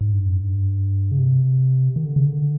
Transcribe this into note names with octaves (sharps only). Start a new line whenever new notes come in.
G#2
G2
F#2
G2
C#3
C3
D#3
D3
C#3
D3